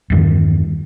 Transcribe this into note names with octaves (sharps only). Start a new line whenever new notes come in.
E2 G2 D#3